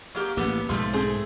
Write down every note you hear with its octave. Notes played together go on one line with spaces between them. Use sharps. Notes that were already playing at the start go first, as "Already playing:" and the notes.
F#3 A#3 G4
A1 A#3 B3 G4
B1 G#2 F3 G#3 A3
A3 C4 G#4